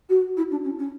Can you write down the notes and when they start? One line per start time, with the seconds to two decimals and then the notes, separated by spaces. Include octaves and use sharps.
0.09 F#4
0.37 E4
0.50 D4
0.64 C#4
0.78 C#4